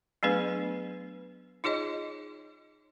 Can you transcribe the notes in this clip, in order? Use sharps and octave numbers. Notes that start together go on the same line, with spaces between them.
F#3 A3 B3 D4 G#4 B4
D#4 F4 G#4 C#5 D#5